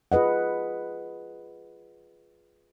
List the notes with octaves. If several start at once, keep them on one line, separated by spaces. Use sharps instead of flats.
F4 G#4 B4 D#5 F#5